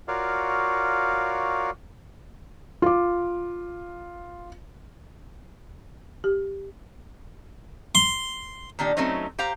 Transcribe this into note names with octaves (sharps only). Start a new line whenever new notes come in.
F4 F#4 A#4 C#5 D5 F5
F4 D6
G4
C6
A#2 D#3 D4 G4
F#3 A3 C4 C#4 D#4
G4 C5 F5 A#5